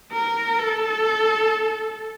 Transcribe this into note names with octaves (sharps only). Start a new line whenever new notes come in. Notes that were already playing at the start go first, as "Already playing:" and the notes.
A#4
A4